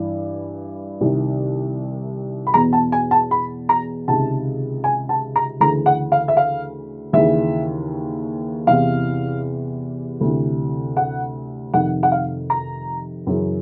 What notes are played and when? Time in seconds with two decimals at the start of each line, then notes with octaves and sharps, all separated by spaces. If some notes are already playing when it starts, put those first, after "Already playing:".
Already playing: G2 E3
1.01 C2 C3 D#3
2.47 B5
2.54 E2 B2 A#5
2.73 A5
2.92 G#5
3.11 A5
3.31 B5
3.69 A#5
4.08 C#2 C3 D#3 A5
4.84 G#5
5.09 A5
5.36 A#5
5.60 D2 C#3 E3 A#5
5.86 F#5
6.12 F5
6.28 E5
6.37 F5
7.13 D#2 C#3 E3 E5
8.67 E2 C3 E3 F5
10.21 D2 C3 E3
10.97 F#5
11.74 F2 C3 D#3 F#5
12.03 F#5
12.12 F5
12.50 A#5
13.27 F#2 C#3 E3